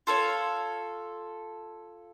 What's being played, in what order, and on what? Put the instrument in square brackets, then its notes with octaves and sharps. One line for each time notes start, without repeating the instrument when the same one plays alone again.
[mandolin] F4 A4 C#5